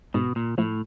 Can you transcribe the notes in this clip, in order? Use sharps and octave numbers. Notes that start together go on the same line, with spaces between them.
G#2 B2
A#2
A2 F3 A3